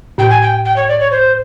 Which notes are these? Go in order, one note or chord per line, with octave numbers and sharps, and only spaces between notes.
A2 G5
G#5
G5
G5
C#5
D5
C#5
C5